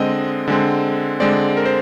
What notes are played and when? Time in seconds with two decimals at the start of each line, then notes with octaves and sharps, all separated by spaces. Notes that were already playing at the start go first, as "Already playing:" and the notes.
Already playing: D3 G#3 C4 D#5
0.48 D3 G#3 C4
1.20 D3 G#3 C4 D5
1.57 A#4
1.66 C5